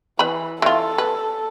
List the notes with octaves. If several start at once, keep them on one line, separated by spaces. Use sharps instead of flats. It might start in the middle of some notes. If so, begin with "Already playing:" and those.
E3 B4 B5
E3 F4 A4
B4